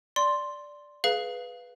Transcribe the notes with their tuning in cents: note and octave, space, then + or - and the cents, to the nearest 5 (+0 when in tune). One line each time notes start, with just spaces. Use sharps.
D5 +0 C6 +0
G#4 +25 B4 +5 F5 +0